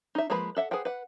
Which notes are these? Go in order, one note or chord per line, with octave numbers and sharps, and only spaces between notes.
D#4 E5
F3 G#3 A#3 B4 B5
A4 E5 F#5
G#4 B4 C5 F#5 G5
B4 F#5